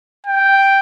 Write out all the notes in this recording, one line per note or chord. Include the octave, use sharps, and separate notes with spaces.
G5